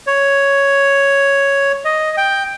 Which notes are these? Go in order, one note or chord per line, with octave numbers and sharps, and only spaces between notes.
C#5
D#5
G5